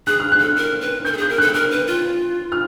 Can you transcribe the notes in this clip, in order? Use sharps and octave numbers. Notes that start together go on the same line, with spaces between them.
G#4 F#6
F6
F#6
A4
A#4
B4
A#4 G6
A4
G#4
G6
A#4
A4 F#6
A#4 F6
B4
F4
F6